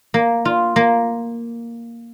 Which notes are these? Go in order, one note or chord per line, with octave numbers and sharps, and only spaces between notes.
A#3
F4
A#3